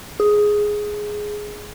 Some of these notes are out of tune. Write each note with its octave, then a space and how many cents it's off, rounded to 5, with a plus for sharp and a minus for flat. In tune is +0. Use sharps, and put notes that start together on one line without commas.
G#4 +5